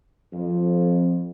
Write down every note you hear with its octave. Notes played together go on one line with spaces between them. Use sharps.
F2